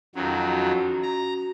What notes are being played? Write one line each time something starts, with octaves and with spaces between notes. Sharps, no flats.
F2 D#3 F#3 C#4 F#4
A#5